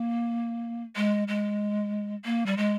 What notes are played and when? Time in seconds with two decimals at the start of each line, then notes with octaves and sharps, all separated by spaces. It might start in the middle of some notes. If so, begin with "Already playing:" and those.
Already playing: A#3
0.96 G#3
1.28 G#3
2.25 A#3
2.46 G3
2.57 G#3